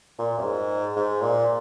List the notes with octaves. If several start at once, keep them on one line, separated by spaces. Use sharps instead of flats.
A#2
F#2
G#2
G#2
A#2